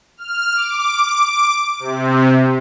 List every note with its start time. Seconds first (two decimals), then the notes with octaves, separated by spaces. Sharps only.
0.17 F6
0.55 D6
1.80 C3